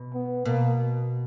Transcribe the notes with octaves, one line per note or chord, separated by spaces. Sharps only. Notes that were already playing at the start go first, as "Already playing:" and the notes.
Already playing: B2
B3
B2 A#3